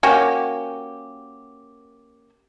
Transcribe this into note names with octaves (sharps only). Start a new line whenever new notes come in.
A#3 C#4 F#4 G4